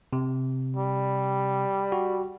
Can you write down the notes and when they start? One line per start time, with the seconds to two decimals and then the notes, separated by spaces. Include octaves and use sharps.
0.13 C3
0.77 G3
1.92 F#4